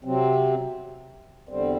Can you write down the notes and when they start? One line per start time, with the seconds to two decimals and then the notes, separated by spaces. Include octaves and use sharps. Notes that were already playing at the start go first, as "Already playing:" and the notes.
0.04 C3 F#3 C4
1.49 E2 D3 G3 C4